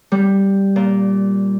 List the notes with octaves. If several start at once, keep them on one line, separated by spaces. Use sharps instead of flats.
G3
A#2